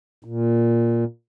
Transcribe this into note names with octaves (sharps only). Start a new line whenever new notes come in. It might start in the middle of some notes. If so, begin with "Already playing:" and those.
A#2